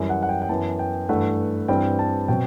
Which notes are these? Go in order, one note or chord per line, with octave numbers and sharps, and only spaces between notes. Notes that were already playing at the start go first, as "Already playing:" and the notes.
Already playing: F#2 E3 G3
F#5
F#5
G5
G5
F#2 E3 B3 A5
G5
G2 E3 A3 F#5
G2 E3 G3 C4 G5
A5
B2 F#3 C4 G5